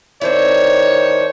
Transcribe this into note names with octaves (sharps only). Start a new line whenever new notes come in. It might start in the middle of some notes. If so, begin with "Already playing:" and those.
D#3 C4 D4 E4 C5 C#5